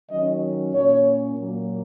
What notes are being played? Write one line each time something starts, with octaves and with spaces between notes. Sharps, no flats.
D#3 F#3 C#4 D#5
A#2 A#3 C#4 C#5
A#2 F#3 A#3